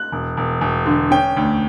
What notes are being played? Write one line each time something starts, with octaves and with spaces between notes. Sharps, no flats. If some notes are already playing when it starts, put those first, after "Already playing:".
Already playing: F#6
E1
E1
E1
D3
C#4 G5
D2